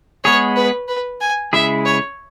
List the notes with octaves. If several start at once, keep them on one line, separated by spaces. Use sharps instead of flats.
G#3 B3 G#4 C#5
B4
B4
G#5
C#3 G#3 E4 G#4 E5
C#5